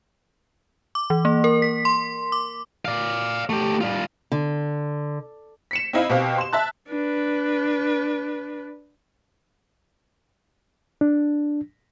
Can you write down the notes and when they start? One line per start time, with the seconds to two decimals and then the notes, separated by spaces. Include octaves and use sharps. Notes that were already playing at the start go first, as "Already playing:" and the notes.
0.95 D6
1.10 E3
1.25 A#3
1.44 A#4
1.62 B6
1.85 C6
2.32 D6
2.85 D5 F5
3.50 A3 G4
3.81 G3 F4
4.32 D3
5.71 B6 C#7 E7
5.93 C4 D#4 E4 F5
6.09 B2 C4 G4 F5
6.38 C6 E7
6.53 E5 A5 F#6
6.88 D4 B4
11.01 D4